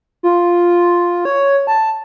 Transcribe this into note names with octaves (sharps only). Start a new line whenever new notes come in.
F4
C#5
A5